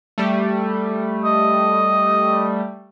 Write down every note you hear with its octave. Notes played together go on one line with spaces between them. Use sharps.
G3 A3
D#5